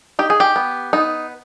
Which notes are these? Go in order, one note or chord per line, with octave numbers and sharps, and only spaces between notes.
D#4 G4
G#4
G4
B3
B3 D#4